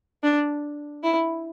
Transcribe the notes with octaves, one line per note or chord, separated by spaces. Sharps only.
D4
E4